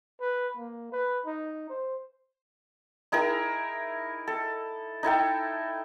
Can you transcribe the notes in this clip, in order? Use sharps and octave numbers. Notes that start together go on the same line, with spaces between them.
B4
A#3
B4
D#4
C5
D#4 E4 G#4 A#4
A4
D#4 E4 A4 G5